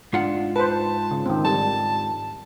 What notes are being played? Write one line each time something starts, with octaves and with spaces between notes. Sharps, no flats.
G#2 D4 F4 F#5
B4 C5 A5
C#3
D#3 C4
G3 A5